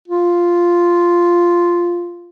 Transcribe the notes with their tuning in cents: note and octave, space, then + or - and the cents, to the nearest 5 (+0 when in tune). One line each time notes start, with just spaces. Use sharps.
F4 -5